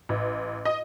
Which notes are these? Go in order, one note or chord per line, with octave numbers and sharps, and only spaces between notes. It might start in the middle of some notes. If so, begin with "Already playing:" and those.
A1
D#5